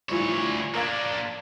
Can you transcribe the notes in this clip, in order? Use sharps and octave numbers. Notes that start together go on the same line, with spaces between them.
D2 E3 F3 G3 C#5
A#3 D4 A#4 F5 G#6